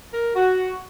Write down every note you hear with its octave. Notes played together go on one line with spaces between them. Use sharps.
A#4
F#4